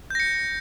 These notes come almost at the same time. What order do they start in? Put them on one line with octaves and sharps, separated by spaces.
G6 A#6 C#7